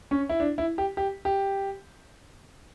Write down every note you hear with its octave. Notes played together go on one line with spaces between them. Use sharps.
C#4
E4
D4
E4
G4
G4
G4